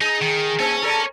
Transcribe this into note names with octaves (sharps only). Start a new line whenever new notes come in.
D#4 G#4
D#3
A#3 C#5 G#5
A4 A#4 D5